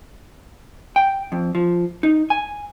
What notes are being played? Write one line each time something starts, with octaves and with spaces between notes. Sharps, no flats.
G5
F2
F3
D#4
G#5